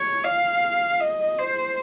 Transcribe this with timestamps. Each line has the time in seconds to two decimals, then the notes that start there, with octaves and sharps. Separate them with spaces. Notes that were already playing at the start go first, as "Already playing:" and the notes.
Already playing: C#5
0.25 F5
1.00 D#5
1.39 C5